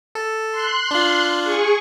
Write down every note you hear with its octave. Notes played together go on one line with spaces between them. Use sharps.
A4
C6 F#6
D4 F4
G#4 C#6